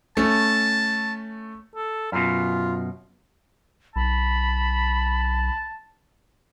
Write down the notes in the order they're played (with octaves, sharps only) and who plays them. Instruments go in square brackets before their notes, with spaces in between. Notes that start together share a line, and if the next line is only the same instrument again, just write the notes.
[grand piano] A3 C#4 [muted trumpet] A5
[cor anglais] A4
[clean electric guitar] F#2 B2 [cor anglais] F4
[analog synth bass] B1 [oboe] A5 [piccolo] B5